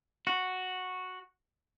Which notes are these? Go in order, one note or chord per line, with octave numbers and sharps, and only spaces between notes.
F#4